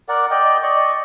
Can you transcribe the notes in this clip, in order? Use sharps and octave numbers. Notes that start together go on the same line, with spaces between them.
A#4 D5 F#5
D5 D#5 G5
D5 D#5 C#6